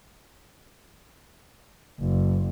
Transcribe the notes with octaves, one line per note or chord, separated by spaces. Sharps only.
F#1